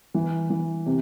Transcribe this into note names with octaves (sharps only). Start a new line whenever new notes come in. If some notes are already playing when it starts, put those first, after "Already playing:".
E3
E3
C3